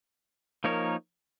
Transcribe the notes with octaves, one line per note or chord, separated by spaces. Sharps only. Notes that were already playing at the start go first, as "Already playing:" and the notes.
F3 A#3 D#4 A#4 C#5